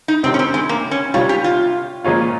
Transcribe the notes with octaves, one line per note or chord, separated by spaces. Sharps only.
D#4
C#2 C3 D#3 C4
C#4
C4
G#3
A#3
C#4
C3 G3 C#4 F4
G4
F4
A#2 F3 G#3 C#4 F4